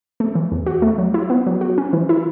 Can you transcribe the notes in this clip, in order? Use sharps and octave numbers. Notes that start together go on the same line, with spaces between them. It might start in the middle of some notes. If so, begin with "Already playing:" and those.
A3
E3
E2
F#4
A3
F#3
E4
B3
F#3
F#4
C#4
E3
E4